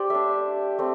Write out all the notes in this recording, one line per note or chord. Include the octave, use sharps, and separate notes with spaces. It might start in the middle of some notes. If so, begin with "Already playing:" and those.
Already playing: G4 C5 D5
A3 D4 E5
A3 C4